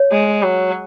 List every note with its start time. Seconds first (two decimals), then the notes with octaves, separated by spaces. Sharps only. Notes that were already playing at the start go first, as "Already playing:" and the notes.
Already playing: C#5
0.11 G#3
0.42 F#3